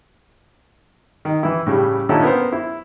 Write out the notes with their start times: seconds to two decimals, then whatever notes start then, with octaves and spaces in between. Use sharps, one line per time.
1.25 D#3
1.43 E3 E4
1.67 A2 C#3 G3
2.09 A#2 D3 D#3 C#4 E4 A4
2.23 B3 A#4 C5
2.52 E4